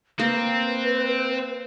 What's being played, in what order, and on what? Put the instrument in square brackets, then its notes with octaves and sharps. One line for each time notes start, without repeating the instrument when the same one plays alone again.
[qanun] A#3 [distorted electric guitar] C4 [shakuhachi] B4